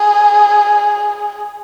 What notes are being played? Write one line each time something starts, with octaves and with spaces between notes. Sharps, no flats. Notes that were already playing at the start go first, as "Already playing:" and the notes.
Already playing: G#4